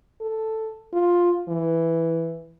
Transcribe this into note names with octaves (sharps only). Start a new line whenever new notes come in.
A4
F4
E3